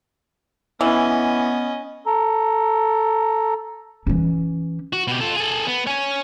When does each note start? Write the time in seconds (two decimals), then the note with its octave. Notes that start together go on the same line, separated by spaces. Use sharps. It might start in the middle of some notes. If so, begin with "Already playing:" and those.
0.81 E3 B3 C#4 D#5
2.06 A4 A#5
4.07 E3 C#4
4.93 F#4
5.07 B2 G4
5.21 F4 A4
5.36 G#4 A4
5.67 B3
5.87 C#5 G#5